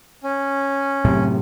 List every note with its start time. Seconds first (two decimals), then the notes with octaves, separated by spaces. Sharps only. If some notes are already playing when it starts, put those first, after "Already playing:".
0.23 C#4
1.05 F#2 A2 C3